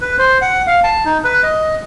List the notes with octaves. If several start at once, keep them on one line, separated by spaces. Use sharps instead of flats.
B4
C5
F#5
F5
A5
D#4
B4
D#5